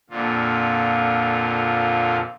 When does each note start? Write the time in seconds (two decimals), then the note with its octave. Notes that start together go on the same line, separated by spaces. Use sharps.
0.10 F2 A#2 D3 F4